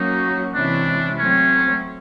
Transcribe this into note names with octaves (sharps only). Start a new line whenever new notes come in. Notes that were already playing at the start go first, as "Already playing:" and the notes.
Already playing: F#3 A#3 C#4 D#4 F#4
C3 E3 G#3 C#4 D4 E4
F#3 A3 C4 C#4